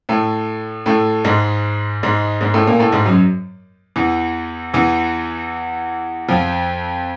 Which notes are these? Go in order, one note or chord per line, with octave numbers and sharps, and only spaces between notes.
A2 A3
A2 A3
G#2 G#3
G#2 G#3
G#2 G#3
A2 A3
A#2 A#3
A2 A3
G#2 G#3
F#2 F#3
E2 E3
E2 E3
F2 F3